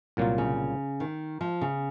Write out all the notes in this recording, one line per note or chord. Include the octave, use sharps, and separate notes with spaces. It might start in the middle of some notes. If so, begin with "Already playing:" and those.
C2 A#2 F#3 A#3 F4
C#3
D#3
F3
C#3